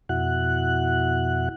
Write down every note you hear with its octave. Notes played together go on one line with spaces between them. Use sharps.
F2 B2 E4 F#4 F#5 F#6